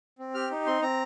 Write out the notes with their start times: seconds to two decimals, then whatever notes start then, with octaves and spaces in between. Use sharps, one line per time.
0.19 C4
0.34 G4 F6
0.51 D#4
0.66 C4 C6
0.82 C4 A#5